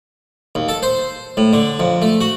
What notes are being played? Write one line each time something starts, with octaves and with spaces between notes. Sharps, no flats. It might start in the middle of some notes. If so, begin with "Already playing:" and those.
D#2
A4
C5
A2
D3
F2
A3
F#4